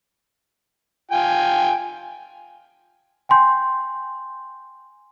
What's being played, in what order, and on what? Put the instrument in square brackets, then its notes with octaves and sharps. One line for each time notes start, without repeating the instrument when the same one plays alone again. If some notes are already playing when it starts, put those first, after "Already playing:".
[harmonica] F4 G5 G#5
[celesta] G5 G#5 C6 G6